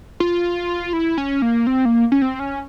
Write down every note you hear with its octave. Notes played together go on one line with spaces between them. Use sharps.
F4
E4
C#4
A#3
C4
A#3
C#4
C4
C#4